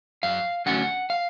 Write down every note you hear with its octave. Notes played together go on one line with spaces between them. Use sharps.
F#2 F5
D3 F#3 A3 C#4 F#5
F5